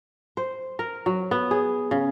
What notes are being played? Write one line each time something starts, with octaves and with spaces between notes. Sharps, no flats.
C5
A#4
F#3
B3
G#4
C#3